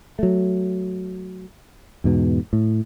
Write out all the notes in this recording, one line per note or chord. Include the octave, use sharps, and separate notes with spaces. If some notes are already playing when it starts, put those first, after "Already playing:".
F#3 A3
E2 G#2 B2
A2